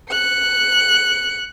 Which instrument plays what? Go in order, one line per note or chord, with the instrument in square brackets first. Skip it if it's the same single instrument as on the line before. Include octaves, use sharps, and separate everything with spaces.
[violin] F#6 C#7